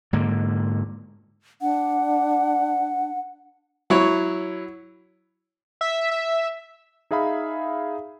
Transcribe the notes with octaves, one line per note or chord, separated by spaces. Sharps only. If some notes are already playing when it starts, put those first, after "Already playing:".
G#2 D3 A#3
D4 F#5
F#3 E4 C#5
E5
E5
D#4 G#4 E5 F5 B5